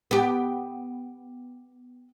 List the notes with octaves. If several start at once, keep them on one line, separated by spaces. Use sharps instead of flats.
B3 G4